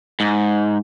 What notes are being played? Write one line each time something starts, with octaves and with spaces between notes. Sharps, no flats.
G#2